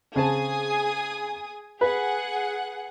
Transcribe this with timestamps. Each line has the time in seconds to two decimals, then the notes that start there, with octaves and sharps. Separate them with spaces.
0.16 C#3 C4 G#4 G#5 A5 D#6
1.81 G#4 B4 F#5